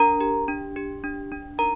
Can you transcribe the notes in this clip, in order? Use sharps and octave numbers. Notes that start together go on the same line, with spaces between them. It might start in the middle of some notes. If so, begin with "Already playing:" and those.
Already playing: D4 A#4 A#5
G4
D4
G4
D4
D4
D#4 A#4 A#5